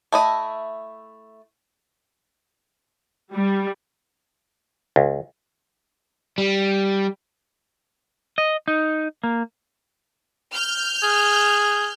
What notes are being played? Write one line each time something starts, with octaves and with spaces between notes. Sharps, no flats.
A3 E4 D#5
G3
C#2
G3
D#5
D#4
A#3
F6 G6
G#4